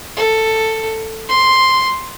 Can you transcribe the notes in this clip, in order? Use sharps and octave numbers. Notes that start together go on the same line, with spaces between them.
A4
C6